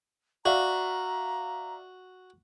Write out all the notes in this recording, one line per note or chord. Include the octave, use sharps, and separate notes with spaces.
F#4 D5 E5 F5 A#5